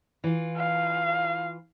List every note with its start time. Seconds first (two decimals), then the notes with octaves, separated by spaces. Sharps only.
0.24 E3 F4
0.58 F5